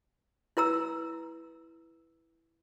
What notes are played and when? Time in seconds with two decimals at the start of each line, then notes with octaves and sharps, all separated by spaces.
0.57 E4 B4 A#5 E6